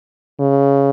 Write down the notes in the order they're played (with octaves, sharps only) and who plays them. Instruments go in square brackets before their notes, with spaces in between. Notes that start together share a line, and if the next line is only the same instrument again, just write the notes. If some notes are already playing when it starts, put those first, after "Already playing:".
[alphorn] C#3